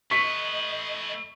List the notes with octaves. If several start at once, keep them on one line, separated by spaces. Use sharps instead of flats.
A3 B4 D#5 C#6 B6